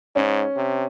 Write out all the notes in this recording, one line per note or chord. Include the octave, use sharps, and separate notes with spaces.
G#2 C#4
C3